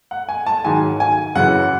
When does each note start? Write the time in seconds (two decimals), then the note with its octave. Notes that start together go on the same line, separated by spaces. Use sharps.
0.11 F#5
0.29 G#5
0.46 A5
0.64 G#2 D#3 F#3 G#5
1.00 G#5
1.35 F#2 C#3 E3 F#5